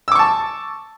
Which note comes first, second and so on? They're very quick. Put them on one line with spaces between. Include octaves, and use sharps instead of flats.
E6 D6 C#6 A5